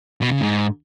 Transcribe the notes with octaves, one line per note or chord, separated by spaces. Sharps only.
B2
C#3
G#2